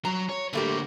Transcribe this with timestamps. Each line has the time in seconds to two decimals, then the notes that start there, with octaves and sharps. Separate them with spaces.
0.05 F#3 A#5
0.29 C#5
0.53 D3 G3 A3 A#3 G4